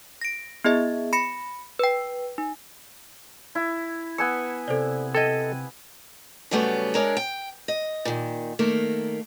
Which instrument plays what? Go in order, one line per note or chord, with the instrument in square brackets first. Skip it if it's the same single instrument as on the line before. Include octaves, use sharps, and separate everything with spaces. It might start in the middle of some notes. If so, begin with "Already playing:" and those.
[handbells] A#6 D7
B3 E4 G#4 D#5 E5
B5 A#6 C#7
B4 G5
D#4
[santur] E4
[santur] B3 G#5 E6 [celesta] C#7
[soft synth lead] C3 [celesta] A4 C5 D5
[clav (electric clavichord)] A4 D#5 [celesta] G5 G#6 D#7
[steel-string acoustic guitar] C#3 F#3 G3 A3 B3
G#3 D4 A#4 C#5
G5
D#5
A#2 D#3
D#3 A3 A#3